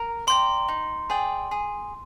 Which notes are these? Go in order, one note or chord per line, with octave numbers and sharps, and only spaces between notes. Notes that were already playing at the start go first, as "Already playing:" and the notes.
Already playing: A#4
D5 G5 A#5 C6
D#4
G#4 D5 G5
G#4